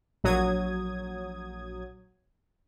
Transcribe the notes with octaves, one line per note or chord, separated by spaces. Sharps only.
A#1 F#3 D#6 G#6